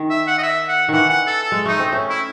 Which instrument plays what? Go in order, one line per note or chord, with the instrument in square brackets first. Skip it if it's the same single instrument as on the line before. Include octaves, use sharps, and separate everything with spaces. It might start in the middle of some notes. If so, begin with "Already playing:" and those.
Already playing: [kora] D#3
[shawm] E5
F#5
D#5
E5
F#5
[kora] D#3 E3 [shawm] F#5
[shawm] F#5
A4
A4
[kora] G#3
[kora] A3 [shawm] D#4
[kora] C4
A3 C#4
[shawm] E4